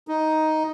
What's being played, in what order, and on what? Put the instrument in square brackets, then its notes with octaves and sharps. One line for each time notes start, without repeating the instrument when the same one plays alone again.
[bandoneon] D#4